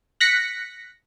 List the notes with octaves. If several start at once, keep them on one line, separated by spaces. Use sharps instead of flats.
F#6 A#6 B6 C#7